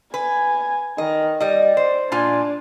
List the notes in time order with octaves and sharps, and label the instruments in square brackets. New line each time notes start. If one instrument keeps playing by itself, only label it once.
[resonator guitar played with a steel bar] B4 [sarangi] G#5
[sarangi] D#3 [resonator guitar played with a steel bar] D#5
[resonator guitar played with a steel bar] G3 D#5 [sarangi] D5
[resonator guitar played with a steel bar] C5
[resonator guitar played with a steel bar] A#2 F4 G#5 [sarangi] D4